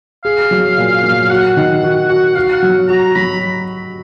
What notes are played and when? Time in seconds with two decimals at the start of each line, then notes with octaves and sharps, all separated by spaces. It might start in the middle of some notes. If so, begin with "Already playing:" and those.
0.25 G#4 F5
0.51 F#3
0.78 A#2
1.04 F#3
1.30 F#4 F#5
1.57 D#3
1.83 F#4
2.10 F#4
2.35 F#4 F5
2.53 F#5
2.63 F#3
2.88 F#4 A#5
3.16 F#3 B5